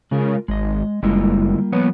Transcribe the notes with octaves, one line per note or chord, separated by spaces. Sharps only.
C#3 G#3 F4 A#4
G#1 G#3 D#5
F#1 D2 G3 G#3 A#3 E4 F4
F3 B3 B4 C#5